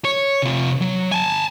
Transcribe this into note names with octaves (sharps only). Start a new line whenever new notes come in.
C#5
C3 F4
F#3
G#5 A5